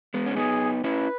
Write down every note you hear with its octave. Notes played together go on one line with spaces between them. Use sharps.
G#3 B3
C#4
B3 D#4 G#4
C#4 E4 B4